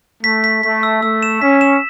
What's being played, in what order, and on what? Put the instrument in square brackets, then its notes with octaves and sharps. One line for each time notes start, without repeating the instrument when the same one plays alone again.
[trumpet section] A3 [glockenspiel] B6
[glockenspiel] B6
[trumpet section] A3 [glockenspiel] B6
[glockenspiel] E6
[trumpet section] A3 [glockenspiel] E6
[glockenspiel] E7
[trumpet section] C#4 [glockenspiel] B6
[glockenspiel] E7